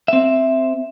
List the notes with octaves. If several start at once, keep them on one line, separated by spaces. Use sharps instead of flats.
C4 E5